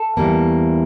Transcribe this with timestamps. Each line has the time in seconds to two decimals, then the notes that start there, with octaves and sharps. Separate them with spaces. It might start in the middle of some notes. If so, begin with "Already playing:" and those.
Already playing: A4
0.17 E2 E3 G3 A#3